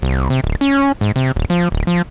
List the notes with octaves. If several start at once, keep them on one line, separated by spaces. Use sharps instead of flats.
C2
C3
D1
C#4
G#2
C3
D#1
F3
D1
F3